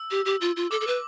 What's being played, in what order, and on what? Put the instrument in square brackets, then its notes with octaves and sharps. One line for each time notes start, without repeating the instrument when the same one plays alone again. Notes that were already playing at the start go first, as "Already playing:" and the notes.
Already playing: [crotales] E6
[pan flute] G4
G4
F4
F4
[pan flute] A4 [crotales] D6
[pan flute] A4
B4